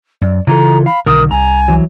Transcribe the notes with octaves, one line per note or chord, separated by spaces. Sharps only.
F#2 D5
C#3 E3 F4 A4 A#5
F5 B5
B1 D3 D#3 A#4 D#6
C2 G#5 A#5
E3 F#3